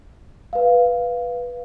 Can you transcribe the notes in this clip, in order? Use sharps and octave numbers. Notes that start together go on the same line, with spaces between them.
B4 F5